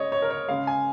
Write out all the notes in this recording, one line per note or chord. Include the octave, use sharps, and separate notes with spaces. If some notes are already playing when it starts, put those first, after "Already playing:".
Already playing: C#3 G#3 C#5 D#5
C#5
A#4
C#5
C#3 G#3 F5
G#5